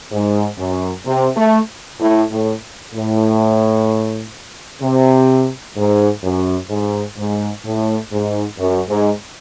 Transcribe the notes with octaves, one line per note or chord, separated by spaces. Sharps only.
G#2
F#2
C3
A3
A2
A2
A2
C3
G#2
F#2
G#2
G#2
A2
G#2
F#2
G#2